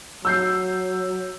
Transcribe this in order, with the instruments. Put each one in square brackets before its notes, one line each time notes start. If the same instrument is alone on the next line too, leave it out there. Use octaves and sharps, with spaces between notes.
[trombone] F#3 [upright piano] E6 G6 C7